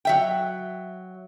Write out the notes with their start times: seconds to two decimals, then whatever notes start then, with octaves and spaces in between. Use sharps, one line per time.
0.05 F#3 E5 G5